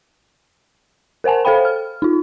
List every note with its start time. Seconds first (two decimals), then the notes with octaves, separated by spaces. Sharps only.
1.24 A#4 C5 F#5 G#5 A5
1.45 A4 C5 F5 G5 B5
1.65 F6
2.02 D#4 F4